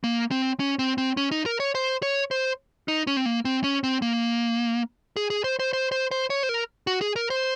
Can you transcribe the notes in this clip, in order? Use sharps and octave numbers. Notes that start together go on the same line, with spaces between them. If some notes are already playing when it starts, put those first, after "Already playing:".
A#3
C4
C#4
C4
C4
C#4
D#4
A#4
C#5
C5
C#5
C5
D#4
C#4
C4
A#3
C4
C#4
C4
A#3
G#4
G#4
C5
C5
C5
C5
C5
C#5
C5
A#4
F#4
G#4
A#4
C5